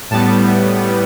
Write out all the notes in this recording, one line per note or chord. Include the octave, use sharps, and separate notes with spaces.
A2 G3 B3 A5